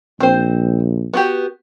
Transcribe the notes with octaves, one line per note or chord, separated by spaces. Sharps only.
A#1 C4 C5
B3 F#4 G4